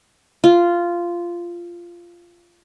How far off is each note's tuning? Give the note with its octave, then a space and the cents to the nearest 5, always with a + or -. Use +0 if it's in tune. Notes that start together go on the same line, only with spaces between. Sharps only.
F4 -10